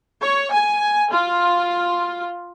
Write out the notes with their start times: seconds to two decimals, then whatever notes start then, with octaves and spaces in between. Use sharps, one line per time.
0.21 C#5
0.52 G#5
1.11 F4